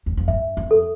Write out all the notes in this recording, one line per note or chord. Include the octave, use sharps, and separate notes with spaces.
E2
F2
G2 E5
F2
A4